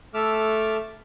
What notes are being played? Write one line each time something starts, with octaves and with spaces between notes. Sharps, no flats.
A3 A4 E5 D6 E6 F6